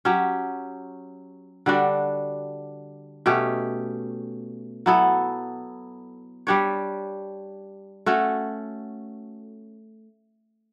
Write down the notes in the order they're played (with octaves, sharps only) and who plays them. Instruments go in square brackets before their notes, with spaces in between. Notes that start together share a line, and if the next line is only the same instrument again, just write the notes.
[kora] F#3 C#4 G4
D3 G3 D4 F#4
B2 A3 C#4 G4
F#3 B3 E4 A4
G3 D4 G4 C#5
A3 C#4 F#4 A4